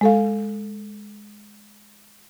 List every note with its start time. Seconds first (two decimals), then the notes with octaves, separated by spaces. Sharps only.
0.01 G#3 A4 F5